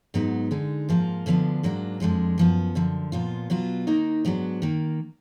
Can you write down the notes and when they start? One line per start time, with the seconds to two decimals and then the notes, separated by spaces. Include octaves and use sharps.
0.14 G#2 F#3 B3 D#4
0.51 D3 G#3 D#4
0.89 G#2 F3 A#3 F4
1.26 D2 D3 F3 B3 D4
1.63 G#2 F#3 A#3 D4
2.00 F2 F3 G#3 D4
2.38 F#2 F3 B3
2.75 F#2 D3 F3
3.12 A#2 F3 B3 F4
3.50 B2 F#3 B3 F4
3.87 D#3 A#3 D#4
4.25 G#2 F#3 B3 D4
4.62 D#3 A#3